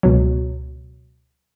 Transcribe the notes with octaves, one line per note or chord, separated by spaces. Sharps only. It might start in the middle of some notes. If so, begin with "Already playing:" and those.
C#2 B2 F#3